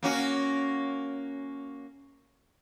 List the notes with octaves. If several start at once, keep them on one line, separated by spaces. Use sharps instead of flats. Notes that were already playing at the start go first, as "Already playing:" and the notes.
A#3 C#4 F#4